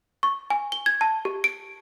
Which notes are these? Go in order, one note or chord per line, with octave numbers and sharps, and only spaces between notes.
C#6
G#5
G7
G#6
A5
G4
D7